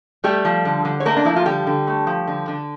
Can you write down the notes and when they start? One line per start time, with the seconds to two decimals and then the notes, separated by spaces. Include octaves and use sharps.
0.24 G3 A3 G4
0.45 F3
0.65 D3
0.85 D3
1.00 C#5
1.05 A3 A#3 A#4
1.17 D4
1.25 F3 E4
1.36 F4
1.45 D3 G3 G4
1.67 D3
1.87 A3
2.07 F3
2.27 D3
2.48 D3